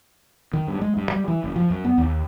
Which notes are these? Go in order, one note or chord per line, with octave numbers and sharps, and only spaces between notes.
D#3
G2
G#3
G2
G3
E3
F#1
F3
F#2
B3
D#2